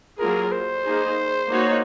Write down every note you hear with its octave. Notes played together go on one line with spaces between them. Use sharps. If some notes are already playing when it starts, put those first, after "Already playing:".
F#3 A#3 F4 G#4 A#4
C5
A#3 D#4 G#4
A#3 D#4 F#4 C#5